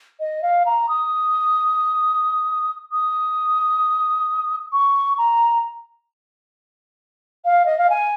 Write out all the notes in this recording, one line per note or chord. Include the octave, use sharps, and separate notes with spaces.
D#5
F5
A#5
D#6
D#6
C#6
A#5
F5
D#5
F5
G#5